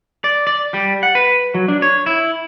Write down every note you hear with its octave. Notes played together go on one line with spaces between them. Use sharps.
D5
D5
G3
F#5
B4
F#3
D4
C#5
E4